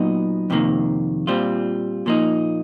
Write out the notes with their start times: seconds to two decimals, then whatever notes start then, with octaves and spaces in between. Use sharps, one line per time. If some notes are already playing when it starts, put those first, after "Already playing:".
Already playing: A#2 F#3 B3 D#4
0.50 F2 C3 D#3 G3 A#3
1.27 A#2 G3 C4 F4
2.06 A#2 F3 A#3 D#4